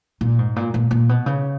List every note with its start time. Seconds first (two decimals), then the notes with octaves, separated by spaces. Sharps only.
0.21 A#2
0.39 G#2
0.56 A#2
0.74 A#2
0.91 A#2
1.09 B2
1.26 C#3